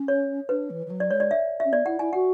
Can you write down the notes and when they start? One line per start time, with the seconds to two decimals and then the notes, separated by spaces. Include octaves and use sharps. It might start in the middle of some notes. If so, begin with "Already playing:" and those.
Already playing: C#4
0.08 C#5
0.49 D4 B4
0.70 E3
0.86 E3
0.90 F#3
1.00 D5
1.11 G#3 C#5
1.20 D5
1.31 E5
1.60 C#4 E5
1.72 B3 D5
1.86 E4 F#5
1.99 E4 G#5
2.13 F#4 F#5